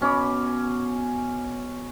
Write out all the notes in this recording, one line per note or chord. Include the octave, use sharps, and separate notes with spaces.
B2 C#4 B5 D6